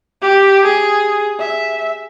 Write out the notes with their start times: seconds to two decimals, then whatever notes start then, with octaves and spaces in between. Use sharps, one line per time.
0.22 G4
0.65 G#4
1.39 E5